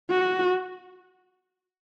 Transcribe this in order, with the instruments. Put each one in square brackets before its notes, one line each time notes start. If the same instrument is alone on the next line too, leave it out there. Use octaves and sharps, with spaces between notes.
[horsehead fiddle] F#4